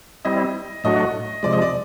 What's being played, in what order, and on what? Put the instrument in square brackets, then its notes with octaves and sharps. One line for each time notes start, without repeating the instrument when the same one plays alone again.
[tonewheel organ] G3 C4 E4 [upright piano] D#5
[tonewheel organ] A2 F#3 A3 D4 F#4 [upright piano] D#5
[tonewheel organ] C3 F3 G#3 [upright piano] D5
[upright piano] D#5
D5